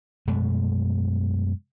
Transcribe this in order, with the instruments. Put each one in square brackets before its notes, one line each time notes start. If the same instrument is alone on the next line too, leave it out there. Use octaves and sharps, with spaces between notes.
[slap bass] F#2 B2 G#3 A3